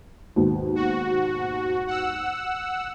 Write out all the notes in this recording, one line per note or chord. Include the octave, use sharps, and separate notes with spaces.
D#2 G#2 B2
F#4
F#5 E6